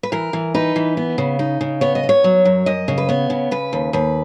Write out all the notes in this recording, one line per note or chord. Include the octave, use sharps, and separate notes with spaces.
B4
E3 A#4
E3
D#4 B4
E3
B3
C#3
D#4
C#3
B3 C#5
D#5
B3
C#5
F#3
F#2
F#2 D#5
C#3
B4
B3 C#5
C#3
C#3 B4
D#2
D#2 B4